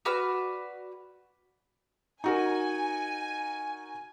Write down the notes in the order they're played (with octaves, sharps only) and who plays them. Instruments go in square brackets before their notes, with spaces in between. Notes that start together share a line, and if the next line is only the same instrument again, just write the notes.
[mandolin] F#4 B4 D5 F6
[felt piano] D#4 F#4 A#4 [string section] G#5